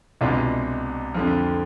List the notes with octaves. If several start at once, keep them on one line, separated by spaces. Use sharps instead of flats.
C2 B2 G#3 D4 F4
F2 D3 F3